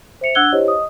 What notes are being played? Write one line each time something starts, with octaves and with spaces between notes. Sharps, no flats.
C5 E5 C#7 F7
D4 F#5 E6 F#6 G#6 G7
E4 G4 C5 C#5 D#5
D#5 D#6